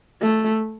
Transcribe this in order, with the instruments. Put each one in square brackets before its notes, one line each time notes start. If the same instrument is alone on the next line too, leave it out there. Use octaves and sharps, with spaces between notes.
[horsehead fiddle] A3